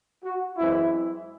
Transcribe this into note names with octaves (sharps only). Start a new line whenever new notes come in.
F#4
F#2 E3 G#3 C4 E4